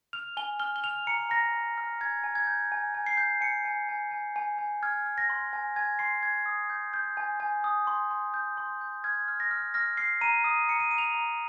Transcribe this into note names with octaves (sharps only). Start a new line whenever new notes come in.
F6 F7
G#5 G7
F6 G7
G7
F6 F7
A#5 C#7
A#5 A#6
A#5
F6
G#5 G#6
G#5
G#6
G6
G#5
G#5
C7
G6
G#5 C#7
G#5
G#5
G#5
G#5
G#5
F6 G#6
F6
A#6
C6
G#5
G#5 G#6
C6 C7
G#5 G#6
D#6
G6
G6
G#5
G#5
D#6
C6
C6
G6
C6
G6
F6 G#6
F6
A#6
F6
F6 A#6
F6 C7
A#5 D#7
D#6 D#7
A#5 C#7
D#7
A#5 D#7
F7
A#5